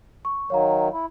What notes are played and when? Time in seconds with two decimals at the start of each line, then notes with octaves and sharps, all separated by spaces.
0.25 C#6
0.50 D#3 F#3 C#5 F5 A#5
0.92 E4